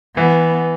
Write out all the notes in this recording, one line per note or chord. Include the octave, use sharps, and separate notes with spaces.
E3 B3